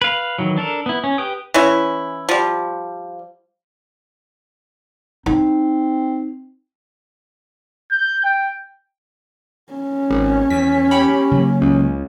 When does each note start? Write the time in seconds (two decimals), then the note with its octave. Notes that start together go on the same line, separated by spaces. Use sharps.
0.02 B4 F5
0.39 D#3 E3 F#3
0.58 D4 A4 A#4
0.86 B3 E4
1.04 C#4
1.18 G4 B4 G5 D#6
1.54 E3 C#4 E4
2.29 F3 G3
5.26 C4 D#4
7.91 G6
8.24 G5
9.73 C#4
10.10 G#1
10.50 E2 B6
10.91 G4 C#5 B5
11.31 C#3 F#3 A#3
11.62 C#2